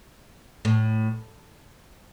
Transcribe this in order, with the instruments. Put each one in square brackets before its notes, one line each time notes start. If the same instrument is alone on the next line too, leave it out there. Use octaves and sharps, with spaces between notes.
[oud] A2